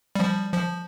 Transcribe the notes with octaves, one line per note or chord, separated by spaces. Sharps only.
F3 G3
F3